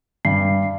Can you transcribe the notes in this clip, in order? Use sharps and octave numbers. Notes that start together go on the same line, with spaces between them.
G2 C7